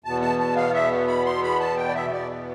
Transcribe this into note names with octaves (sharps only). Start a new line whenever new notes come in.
E2 B2 B3 A5
A5
A5
F5
E5
B5
C6
B5
A5
G5
D5
E5
D5